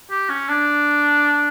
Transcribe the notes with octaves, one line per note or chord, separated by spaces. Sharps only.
G4
C#4
D4